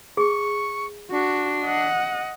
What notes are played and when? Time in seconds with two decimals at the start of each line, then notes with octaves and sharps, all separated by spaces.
0.17 G#4 C#6
1.11 D4 F#4
1.65 D#5 F#5